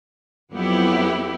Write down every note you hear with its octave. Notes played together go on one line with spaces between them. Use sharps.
F2 F#3 B3 E4 G4